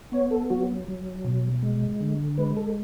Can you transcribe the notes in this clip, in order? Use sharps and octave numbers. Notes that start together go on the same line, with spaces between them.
B3 C#5
A4
F#3 F#4
F#3
B2
G#3
D3
G#3 B4
A4